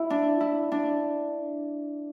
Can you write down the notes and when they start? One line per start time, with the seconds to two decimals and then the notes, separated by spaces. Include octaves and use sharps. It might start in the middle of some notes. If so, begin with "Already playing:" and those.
Already playing: E4
0.10 D4
0.40 E4
0.72 D4